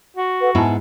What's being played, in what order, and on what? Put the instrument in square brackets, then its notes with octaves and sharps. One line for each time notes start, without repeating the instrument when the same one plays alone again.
[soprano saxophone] F#4
[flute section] A4 B4 F#5
[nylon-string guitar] G#2 B3 E4 [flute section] G#5 A5